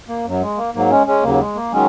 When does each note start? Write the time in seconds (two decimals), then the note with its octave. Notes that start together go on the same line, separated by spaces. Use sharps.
0.09 A#3
0.25 F#2 F#3
0.42 G#3
0.57 A#3
0.74 G#2 F#3 A#3
0.90 G#3 C#4
1.07 G#3 C#4
1.23 D#2 C#3 F#3 A#3
1.40 G#3
1.55 A#3
1.72 D#3 F#3 G#3 C#4